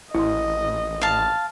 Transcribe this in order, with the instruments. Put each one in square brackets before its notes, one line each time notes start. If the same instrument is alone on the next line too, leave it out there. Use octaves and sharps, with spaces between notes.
[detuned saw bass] A1 [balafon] E4 C6 [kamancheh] D#5
[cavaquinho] F5 A5